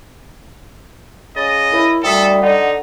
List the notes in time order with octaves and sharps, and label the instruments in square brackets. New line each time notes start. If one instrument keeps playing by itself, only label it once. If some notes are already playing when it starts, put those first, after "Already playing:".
[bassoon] C#3 [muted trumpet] D#5 [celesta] A6
[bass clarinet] E4 [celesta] A#4 C#5
[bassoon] D2 [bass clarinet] G3 [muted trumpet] A4 [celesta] G5 D#6 B6
[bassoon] D3 [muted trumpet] D#4 [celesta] D#5 F#5